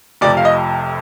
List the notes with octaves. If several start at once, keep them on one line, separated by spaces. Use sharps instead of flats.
F1 F2 C3 D5
F5
D#5